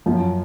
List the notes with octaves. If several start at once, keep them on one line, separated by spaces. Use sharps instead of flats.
F#2 F3